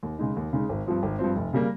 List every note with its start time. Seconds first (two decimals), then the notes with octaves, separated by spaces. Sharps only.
0.03 D#2
0.19 C#3 G#3 D#4
0.37 D#2
0.53 C#3 G#3 D#4
0.69 G#1
0.86 G2 F3 C4
1.03 G#1
1.19 G2 F3 C4
1.36 F1
1.53 C#3 G3 A#3